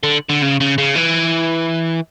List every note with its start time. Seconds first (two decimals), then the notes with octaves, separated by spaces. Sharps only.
0.04 D3
0.29 D3
0.42 C#3
0.60 C#3
0.78 C#3
0.95 E3